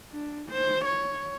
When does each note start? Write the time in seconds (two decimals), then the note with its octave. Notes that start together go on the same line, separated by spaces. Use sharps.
0.11 D4
0.49 C5
0.85 C#5